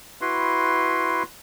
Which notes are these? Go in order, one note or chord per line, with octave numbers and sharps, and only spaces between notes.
E4 F#4 B4 C6